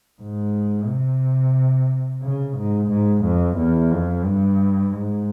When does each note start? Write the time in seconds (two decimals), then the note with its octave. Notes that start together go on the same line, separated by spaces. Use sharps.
0.22 G#2
0.88 C3
2.23 C#3
2.57 G#2
2.91 G#2
3.25 F2
3.57 E2
3.92 F2
4.25 G2
4.92 G#2